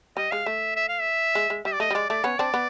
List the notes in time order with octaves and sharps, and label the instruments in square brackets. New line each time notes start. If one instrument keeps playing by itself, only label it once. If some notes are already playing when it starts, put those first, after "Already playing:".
[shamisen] G3 [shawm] D#5
[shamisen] G#3 [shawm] F5
[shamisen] A3 [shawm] E5
[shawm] E5
F5
E5
[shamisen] G#3
G#3
[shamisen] G3 [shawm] E5
[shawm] D5
[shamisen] A3 [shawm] D#5
[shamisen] G3
[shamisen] G#3 [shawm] D5
[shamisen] A3 [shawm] D5
[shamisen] B3 C#4 [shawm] C#5
[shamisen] C4 D4 [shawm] D5
[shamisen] B3